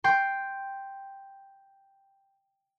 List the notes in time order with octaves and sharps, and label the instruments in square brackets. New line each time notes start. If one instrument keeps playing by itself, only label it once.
[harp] G5 C6